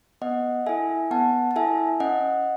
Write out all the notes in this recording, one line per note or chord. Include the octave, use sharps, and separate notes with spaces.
B3 D#5 F#5
E4 A4 E5 G#5
B3 F#5 A5
A5
E4 A4 E5 G#5
C#4 D#5 F#5